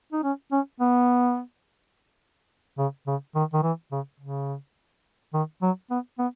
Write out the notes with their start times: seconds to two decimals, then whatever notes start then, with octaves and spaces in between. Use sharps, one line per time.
0.13 D#4
0.23 C#4
0.52 C#4
0.80 B3
2.78 C#3
3.07 C#3
3.35 D#3
3.53 D#3
3.63 E3
3.91 C#3
4.20 C#3
5.34 D#3
5.62 F#3
5.90 B3
6.18 B3